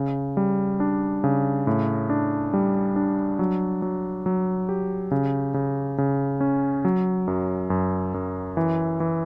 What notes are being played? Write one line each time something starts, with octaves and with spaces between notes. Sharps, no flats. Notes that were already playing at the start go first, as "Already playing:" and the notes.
Already playing: C#3
G3
D4
C#3
A2
D4
G3
D4
F#3
F#3
F#3
G4
C#3
C#3
C#3
C#4
F#3
F#2
F#2
F#2
E3
E3